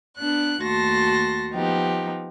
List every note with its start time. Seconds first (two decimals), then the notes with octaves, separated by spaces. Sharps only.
0.18 B3 D4 F#6
0.61 D#2 A3 F#4 A5 C6 A#6
1.54 F3 B3 D#4 G4